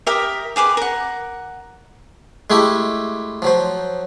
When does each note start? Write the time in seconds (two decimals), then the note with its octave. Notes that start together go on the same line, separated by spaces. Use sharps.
0.07 G4 A#4 D#5 E5
0.56 G4 G#4 B4 D6
0.77 A#4 F#5
2.50 G#3 A3 E4 G4
3.42 F3 F#3 C5